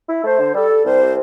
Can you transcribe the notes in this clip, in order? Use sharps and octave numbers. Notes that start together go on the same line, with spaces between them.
E4
A3 C5
D3
G3 A4
G3
C2 C5
C3